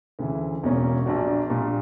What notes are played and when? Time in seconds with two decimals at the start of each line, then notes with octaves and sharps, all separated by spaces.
0.19 D2 C#3 E3
0.63 E1 E2 B2 A#3 C#4
1.06 A#1 A#2 A#3 D4 F#4
1.50 A#1 A#2 G3 A#3